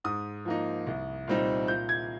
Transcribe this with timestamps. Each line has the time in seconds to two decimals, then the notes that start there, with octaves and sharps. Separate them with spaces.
0.04 G#2 D#6
0.45 F3 A#3 D#4
0.87 C2
1.28 A#2 G3 C4 D#4
1.68 A#2 G6
1.89 G#6